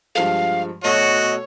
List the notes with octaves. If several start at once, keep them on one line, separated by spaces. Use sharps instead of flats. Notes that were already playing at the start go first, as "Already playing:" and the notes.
G2 F3 G#3 F5
B2 A3 F#4 A4 C#5 D#5